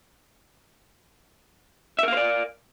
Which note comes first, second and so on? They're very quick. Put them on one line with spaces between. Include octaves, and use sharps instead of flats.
E5 A#4 F5 C5 D5